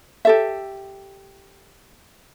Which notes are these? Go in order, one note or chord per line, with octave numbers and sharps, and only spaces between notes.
G4 A4 E5